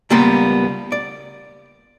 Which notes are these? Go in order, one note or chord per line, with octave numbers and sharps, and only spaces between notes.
C#2 G3 A#3 B3 C6
D5